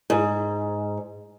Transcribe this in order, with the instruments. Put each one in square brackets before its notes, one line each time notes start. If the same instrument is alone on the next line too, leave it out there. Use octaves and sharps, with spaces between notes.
[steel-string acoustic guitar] G#2